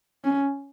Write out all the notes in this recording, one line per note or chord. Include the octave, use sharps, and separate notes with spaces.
C#4